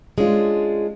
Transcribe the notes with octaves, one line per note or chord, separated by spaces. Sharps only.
G#3 C#4 D4 F4